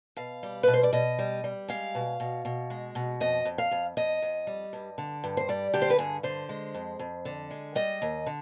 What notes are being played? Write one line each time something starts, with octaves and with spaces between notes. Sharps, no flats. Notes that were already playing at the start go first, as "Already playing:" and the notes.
B2 F5
G3
B2 B4
C5
D5
B2 D#5
G3
G3
G#3 F5
B2
B2
B2
G#3
B2
F2 D#5
F2
F5
F2
F2 D#5
F2
G3
G2
D3
G2
C5
G3 D5
D3 G4
C5
B4
G2 G#4
D3 C5
G#3
F2
F2
D3
G#3
G3 D#5
D#2
D3